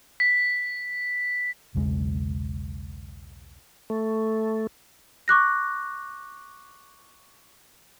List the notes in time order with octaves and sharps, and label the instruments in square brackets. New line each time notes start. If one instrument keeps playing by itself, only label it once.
[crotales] B6
[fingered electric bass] B1 E2 C#3 G#3
[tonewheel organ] A3
[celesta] C#6 D6 F#6 A#6